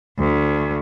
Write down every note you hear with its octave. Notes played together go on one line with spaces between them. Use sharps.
D2